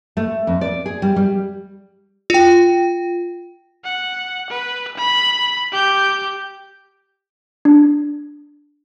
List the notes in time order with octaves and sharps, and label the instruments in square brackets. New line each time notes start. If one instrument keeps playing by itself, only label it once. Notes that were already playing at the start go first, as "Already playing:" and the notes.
[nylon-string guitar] A3
F2
D5
G#4
G3
G3
[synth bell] F4 G5
[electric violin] F#5
B4
B5
G4 G6
[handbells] D4